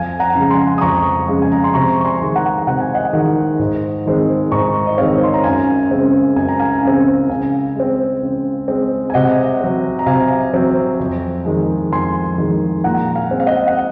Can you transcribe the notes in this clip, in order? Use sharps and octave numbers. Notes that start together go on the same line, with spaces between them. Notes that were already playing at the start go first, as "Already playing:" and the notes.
Already playing: F2 F5 G#5
F#5 A#5
C#3 G#3
G#5 C6
D#6
F2 A#5 C#6
C#3 G#3
G#5
A#5
C6
C3 A#5 C#6
C#6
G#5 C6
D#3 G#3
F#5 A#5
C3 F#5
G#5
D#5 F#5
D#3 G#3
G#2
D#3 G#3 C4
G#2 A#5 C#6
D#5
D#3 G#3 C4 C#5 F5
C6
A#5
F#2 F5 G#5
C#3 G#3 C4
F#2 G#5
A#5
F5 G#5
C#3 G#3 C4
C#3 F5 G#5
G#3 C4
C#3
G#3 C4
G#5
C3 D#5 F#5
F#3 C4
A#5
C3 F5 G#5
F#3 C4
F2
D#3 G#3
F2 G#5 C6
D#3 G#3
A#2 F#5 A#5
F5 G#5
G#3 C4
F5
D#5 F#5
F#5